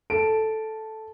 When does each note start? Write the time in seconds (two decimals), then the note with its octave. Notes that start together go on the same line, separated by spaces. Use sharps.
0.10 A4 D7